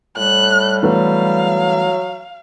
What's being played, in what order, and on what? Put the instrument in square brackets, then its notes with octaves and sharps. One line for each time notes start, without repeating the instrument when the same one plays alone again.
[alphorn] A2 [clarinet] G3 [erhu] F#6
[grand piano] E3 A3 B3 [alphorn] F#3 [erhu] F5